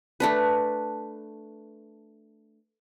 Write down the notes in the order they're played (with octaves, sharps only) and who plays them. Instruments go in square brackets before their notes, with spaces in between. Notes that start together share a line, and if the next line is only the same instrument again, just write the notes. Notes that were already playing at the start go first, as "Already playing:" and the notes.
[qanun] A3 D4 B4